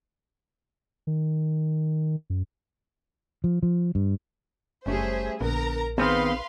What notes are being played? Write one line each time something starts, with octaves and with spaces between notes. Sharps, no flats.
D#3
F#2
F3
F3
G2
F#1 G3 A3 C#4 G#4 C5 E5
A#1 D3 B3 A#4 A#5
D#3 B3 C4 G#4 B4 C5 F5 C6